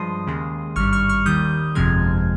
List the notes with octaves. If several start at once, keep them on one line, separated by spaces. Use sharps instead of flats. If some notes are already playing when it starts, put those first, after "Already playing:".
Already playing: G2 F3 G#3 C6 D#6
D#2 C#3 G#3
G#1 G2 G3 C#6 F6
C#6 F6
C#6 F6
D#2 D#3 G3 D#6 G6
G1 F2 C3 F3 G#3 F6 G#6